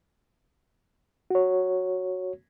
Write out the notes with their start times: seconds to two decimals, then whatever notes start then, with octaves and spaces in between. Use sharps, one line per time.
1.30 F#4 C#5